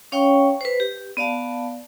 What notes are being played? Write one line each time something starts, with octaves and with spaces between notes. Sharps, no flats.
C#4 C#5 F5 G5 C#6
B4 C5
G4
B3 D5 F5 A5